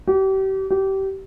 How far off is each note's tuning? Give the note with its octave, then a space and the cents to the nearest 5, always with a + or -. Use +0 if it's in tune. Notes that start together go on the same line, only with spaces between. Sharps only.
G4 -35
G4 -25